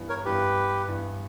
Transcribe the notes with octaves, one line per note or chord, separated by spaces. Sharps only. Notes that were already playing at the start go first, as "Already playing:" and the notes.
Already playing: G2 E3 B3
A#4 C#5
G2 E3 B3 G4 B4
G2 E3 B3